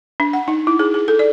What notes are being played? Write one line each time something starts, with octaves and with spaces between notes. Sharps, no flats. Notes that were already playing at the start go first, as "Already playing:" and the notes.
D4
F#5
D#4
E4
G#4
G#4
A4
D5